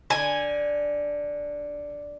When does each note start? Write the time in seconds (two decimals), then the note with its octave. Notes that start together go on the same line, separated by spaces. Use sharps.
0.10 D3 G#5